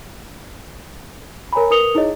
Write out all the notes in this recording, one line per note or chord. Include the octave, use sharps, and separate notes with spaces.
A#4 C#5 G#5 A#5 B5
A#4 B4 D#6 C#7 F7 G7
D#4 E4 G#4 C#5 D#5